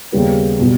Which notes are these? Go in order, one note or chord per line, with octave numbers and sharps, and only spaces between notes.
D#2 C#3 G3 B3
B2 G3